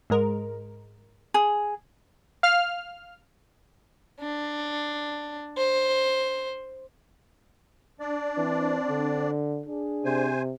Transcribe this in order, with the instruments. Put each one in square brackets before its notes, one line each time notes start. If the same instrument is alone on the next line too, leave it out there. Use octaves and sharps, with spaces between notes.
[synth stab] G#2 G#3 A#4
[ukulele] G#4
[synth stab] F5 F6
[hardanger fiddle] D4
C5
[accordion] D4 D5
[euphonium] E3 [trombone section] C4
[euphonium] D3
[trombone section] D4 G#4
[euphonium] C3 [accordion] C5 G#5